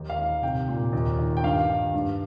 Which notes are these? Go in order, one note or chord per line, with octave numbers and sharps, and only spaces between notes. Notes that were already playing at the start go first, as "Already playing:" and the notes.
Already playing: D#2
F5
D#3
C2 G5
A#2
D#2
D#3
G5
G2 F5
D#3
G2